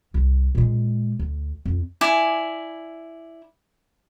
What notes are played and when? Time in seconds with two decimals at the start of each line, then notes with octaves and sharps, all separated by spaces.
0.14 C2
0.55 A#2 G#3
1.19 D2
1.65 F2
2.01 E4 D5 G#5